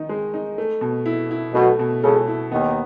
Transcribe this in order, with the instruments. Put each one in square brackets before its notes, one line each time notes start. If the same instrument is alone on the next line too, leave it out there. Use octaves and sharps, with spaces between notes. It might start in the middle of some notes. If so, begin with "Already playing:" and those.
Already playing: [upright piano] D#3 D#4
G#3
D#4
A3
B2
E4
E4
[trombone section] B1 B2 [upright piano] A3
[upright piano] B2
[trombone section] C#2 C#3 [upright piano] A4
[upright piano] E4
[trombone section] D#2 D#3 [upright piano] B3